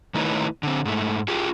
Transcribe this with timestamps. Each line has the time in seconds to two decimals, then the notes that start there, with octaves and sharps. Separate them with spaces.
0.14 D#3 A3 D#4 E4 B4 C#5
0.63 D3 C4
0.85 G#2 A3
1.28 F4 G4 G#4